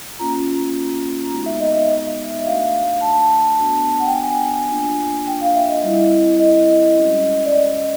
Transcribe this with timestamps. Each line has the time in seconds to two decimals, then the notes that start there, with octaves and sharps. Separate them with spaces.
0.19 A#3 C#4 F4 A#5
1.32 G#3 B3 D#4 F#4
1.46 E5
1.60 D#5
1.74 D#5
1.89 E5
2.45 A3 D4 F#4 F5
3.01 A5
3.58 B3 D4 F#4
4.00 F#5
4.07 G5
4.14 G#5
4.70 A#3 D4 F4
5.27 G5
5.41 F5
5.55 E5
5.69 D#5
5.83 G3 C4 E4
6.40 D#5
6.96 G#3 C#4 F#4
7.45 D5
7.52 D#5